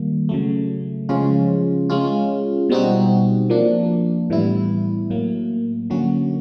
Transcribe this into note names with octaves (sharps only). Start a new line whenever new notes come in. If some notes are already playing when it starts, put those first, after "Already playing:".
Already playing: D#3 G3 A#3
C#3 F#3 A3
C#3 F3 G#3 C#4 F4
G#3 C#4 F4
B2 G3 C4 D#4 F#4
F3 A#3 D4
A2 E3 G3 B3 E4
A2 F#3 A#3
D3 F#3 A#3 C#4 F#4